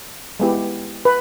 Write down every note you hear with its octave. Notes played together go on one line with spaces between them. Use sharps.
G#3 B3 E4 G4
B4